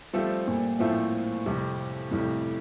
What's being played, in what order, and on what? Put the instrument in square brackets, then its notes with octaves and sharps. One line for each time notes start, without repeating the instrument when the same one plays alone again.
[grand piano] F3 A3 C4 F4 A4 [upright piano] G3
[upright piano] A#2
[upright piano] A2 [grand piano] F3 A3 C4 F4 A4
[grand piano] F2 C3 G3
[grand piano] F2 C3 G3 [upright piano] A2